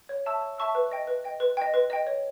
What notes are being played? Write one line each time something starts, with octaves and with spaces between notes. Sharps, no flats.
C#5
E5 A5 C#6 E6
C#5
E5 A5 C#6 E6
B4
D#5 G5
B4
D#5 G5
B4
D#5 G5
B4
D#5 G5
C#5